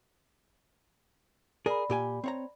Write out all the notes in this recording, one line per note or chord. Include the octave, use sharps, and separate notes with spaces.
G#4 A#4 D5 B5
A#2 G4 G#5
C4 C#5 A#5